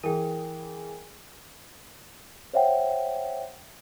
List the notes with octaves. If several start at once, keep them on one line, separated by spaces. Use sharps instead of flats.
E3 G#4 A#4 G5
C5 C#5 E5 F#5 G5